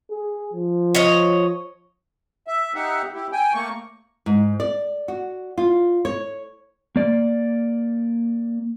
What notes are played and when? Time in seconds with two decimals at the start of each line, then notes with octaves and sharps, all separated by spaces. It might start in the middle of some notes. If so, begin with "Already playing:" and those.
0.10 G#4
0.53 F3
0.95 C#5 D#5
2.47 E5
2.75 D#4 G4 E5 F#5
3.14 E4 G4
3.32 G5 G#5
3.54 A3 A#3 C#6
4.26 G#2
4.60 D5
5.08 F#4
5.58 F4
6.05 C#5
6.96 A#3 D5